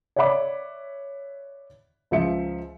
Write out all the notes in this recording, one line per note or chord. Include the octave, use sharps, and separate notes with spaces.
C#5 D5 E5 F#5 B5 D6
C#2 F3 E5 C#7